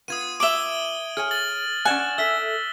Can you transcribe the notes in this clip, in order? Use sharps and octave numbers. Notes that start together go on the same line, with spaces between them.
B3 F4 D#6 G#6 D#7
E5 D6 D7 F#7 G7
G#4 C#5 G#5 F6
A6 F#7
C#4 D5 F#5 G#5 F#6 E7
A4 E5 E6 B6 G7